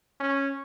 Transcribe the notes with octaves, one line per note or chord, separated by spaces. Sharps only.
C#4